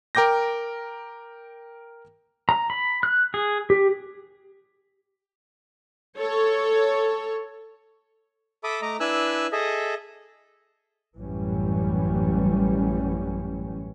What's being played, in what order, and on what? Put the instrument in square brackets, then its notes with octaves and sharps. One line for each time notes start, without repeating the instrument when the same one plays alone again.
[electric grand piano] A#4 G5 D6 G6 A#6
[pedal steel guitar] A#5
B5
F#6
G#4
G4
[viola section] A4 C#5
[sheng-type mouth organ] A4 E5 B5 D6 D#6
A3 D#5 A#5 D6
D4 E4 B4 G#5 E6 F#6
G#4 A4 D#5 E5
[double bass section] A1 F#2 E3 G3 C#4